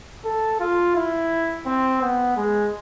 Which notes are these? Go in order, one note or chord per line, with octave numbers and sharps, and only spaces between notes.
A4
F4
E4
C4
B3
G#3